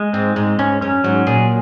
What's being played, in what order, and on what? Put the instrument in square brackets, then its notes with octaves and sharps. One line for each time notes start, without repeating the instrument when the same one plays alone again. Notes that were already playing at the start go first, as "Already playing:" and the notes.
Already playing: [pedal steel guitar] G#3
[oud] G#2 [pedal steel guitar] C4
[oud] G#2 [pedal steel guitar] G#3
[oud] G#2 [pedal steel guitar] C#4
[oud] F#2 [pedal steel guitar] C#4
[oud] G#2 [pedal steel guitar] F#3
[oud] A#2 [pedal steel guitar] G#4